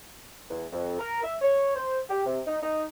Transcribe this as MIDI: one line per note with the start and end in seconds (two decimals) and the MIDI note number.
0.50 0.66 40
0.72 0.96 41
0.99 1.20 70
1.23 1.35 76
1.42 1.74 73
1.76 1.98 72
2.09 2.23 67
2.26 2.41 48
2.47 2.57 63
2.63 2.85 63